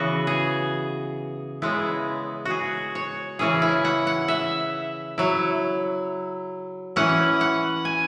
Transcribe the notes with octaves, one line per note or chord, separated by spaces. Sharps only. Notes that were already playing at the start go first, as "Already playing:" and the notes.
Already playing: C#3 E3 B3 F#4
G#4
C#3 G#3 B3 E4
F#4 G#4
C#5
C#3 E3 C#4 E4 G#4
E4
F#5
F#5
E5
F#3 E4
E3 C#4 E4 F#5
F#5
G#5